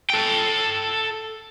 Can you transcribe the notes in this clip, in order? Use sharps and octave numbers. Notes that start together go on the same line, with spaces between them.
A4 G5